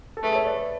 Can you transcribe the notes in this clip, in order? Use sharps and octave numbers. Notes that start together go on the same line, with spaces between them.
A4
A3 G#4 B4
A4 C#5
B4 D5